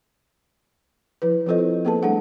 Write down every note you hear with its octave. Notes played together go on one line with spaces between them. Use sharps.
F3 E4 B4
F3 C4 F4 A4 C5 D#5
E4
A#3 B3 G#4 A4 B4 A5
G3 A3 D4 G#4 A4 F#5